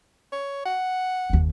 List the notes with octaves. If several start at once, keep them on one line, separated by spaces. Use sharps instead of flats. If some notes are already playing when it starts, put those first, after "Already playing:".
C#5
F#5
F#1 D#2